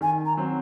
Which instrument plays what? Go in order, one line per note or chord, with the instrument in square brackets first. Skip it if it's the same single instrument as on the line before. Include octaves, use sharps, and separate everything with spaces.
[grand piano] D#3 [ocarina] G#5
[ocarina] A#5
[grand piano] F#3 C4